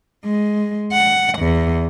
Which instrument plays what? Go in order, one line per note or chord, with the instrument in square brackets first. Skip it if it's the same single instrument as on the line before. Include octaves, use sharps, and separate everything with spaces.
[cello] G#3
F#5
E2